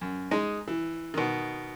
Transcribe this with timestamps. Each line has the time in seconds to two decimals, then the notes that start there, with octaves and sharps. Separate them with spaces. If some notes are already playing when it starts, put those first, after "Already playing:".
0.01 F#2
0.31 G#3 D#4
0.68 E3
1.14 B2 D#3